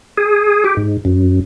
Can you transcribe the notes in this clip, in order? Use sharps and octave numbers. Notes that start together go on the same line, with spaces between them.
G#4
G4
G#2
F#2